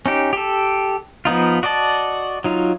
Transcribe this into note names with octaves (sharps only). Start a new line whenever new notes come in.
C#4 D#4 G4
G4 A4
F3 B3 D#4 F4
F#4 D5 D#5 A5
F#3 D#4 F4